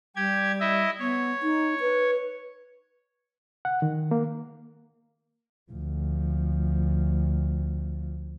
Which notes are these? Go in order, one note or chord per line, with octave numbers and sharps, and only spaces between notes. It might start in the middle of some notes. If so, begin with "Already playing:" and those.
G3 G4 G#6
E4 D#5 E5
B3 C#5
D#4
B4
F#5
D#3
A#3
D2 F3